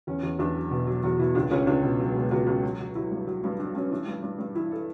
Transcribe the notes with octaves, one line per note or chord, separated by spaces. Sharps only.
E2 C#4
E2
E2 D4
F#3
B2
F#3
E2 F#4
B2 E4
C#2 D4
C#2 C#4
C#2 D4
B2
F#3
B2
C#2 F#4
C#2
F#3
F#3
F#3 E4
G2
F#3
G2
F#3 D4
G2 C#4
E3 D4
G2
G2
G2
E3 E4
A4